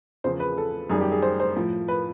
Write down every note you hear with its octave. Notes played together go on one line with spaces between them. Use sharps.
E2 C#3 F3 C5
B4
A4
F#2 D#3 G3 G#4
G4
G#4
C5
C5
A2 F3
B4